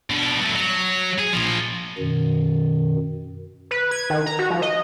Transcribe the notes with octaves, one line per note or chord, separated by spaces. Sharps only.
B2 D4
F#3 A3
F#3
G#4
A#2 F3
F#2 B2 D#3
B4
G#6
D#3
A#5
F#4
F3
D#5